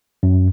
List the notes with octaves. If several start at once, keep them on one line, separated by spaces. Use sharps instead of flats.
F#2